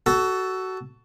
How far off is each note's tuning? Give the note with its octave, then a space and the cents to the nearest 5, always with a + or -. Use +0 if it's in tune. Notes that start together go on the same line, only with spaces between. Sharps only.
F#4 +20 A4 +0